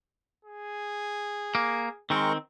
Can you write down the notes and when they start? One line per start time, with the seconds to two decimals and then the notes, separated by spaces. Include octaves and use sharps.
0.45 G#4
1.55 A#3
2.10 D#3 G#3 C4 A#4 C#6